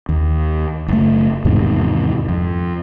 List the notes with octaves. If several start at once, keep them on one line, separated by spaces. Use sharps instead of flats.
D#2
F#1 A3
E2 G#2 C3 D#3
F2